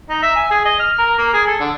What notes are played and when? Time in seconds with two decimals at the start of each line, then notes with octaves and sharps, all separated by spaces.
0.10 D#4
0.23 E5
0.36 G#5
0.51 G#4
0.65 D#5
0.79 F6
0.98 A#4
1.18 A#3
1.33 G#4
1.47 A4
1.60 D3